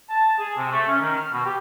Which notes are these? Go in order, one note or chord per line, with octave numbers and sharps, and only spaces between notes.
A5
G#4
C3
A3
C#4
D#3
F6
B2
G4